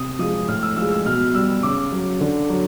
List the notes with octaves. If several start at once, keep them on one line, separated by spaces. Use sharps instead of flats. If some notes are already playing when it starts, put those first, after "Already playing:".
Already playing: C3 D#6
F3 G#3 D#6
A2 F6
E6
F3 G#3 E6
E6
B2 F6
G3 E6
C#3 D6
F#3
D3
F#3